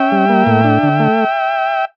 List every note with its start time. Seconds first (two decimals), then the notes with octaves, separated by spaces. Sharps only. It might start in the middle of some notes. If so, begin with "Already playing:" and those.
Already playing: C#4 E5 G5
0.12 G3
0.29 A#3
0.47 A2
0.64 D4
0.83 D3
1.00 A3